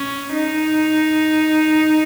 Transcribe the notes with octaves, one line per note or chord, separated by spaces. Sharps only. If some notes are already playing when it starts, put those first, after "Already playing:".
Already playing: C#4
D#4